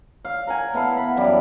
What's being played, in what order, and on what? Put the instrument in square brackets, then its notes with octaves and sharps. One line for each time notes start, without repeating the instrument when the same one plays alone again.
[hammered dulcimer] F5
A#4 F#5 G#5
B3 E4 A4 F5
B3 B5
F#2 E3 G3 D5